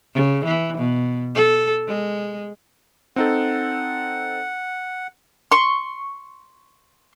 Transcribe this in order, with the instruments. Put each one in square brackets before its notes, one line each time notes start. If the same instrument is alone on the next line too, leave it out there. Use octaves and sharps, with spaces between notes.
[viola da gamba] C#3
E3
B2
A4
G#3
[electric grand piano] C4 D#4 A4 [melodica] F#5
[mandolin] C6 C#6